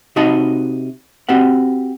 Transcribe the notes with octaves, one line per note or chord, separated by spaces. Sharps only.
C3 D#4 F#4 D#5 A5
C4 F#4 G4 F#5